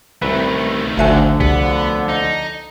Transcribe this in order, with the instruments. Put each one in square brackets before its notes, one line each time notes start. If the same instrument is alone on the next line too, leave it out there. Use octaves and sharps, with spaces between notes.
[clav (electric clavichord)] C2 B4 [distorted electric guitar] D#3 A3
[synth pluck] G#1 E5 G#5 [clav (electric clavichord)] D2 F#5 [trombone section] D3 F3
[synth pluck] C2 C3 [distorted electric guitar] B3
[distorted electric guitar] D#4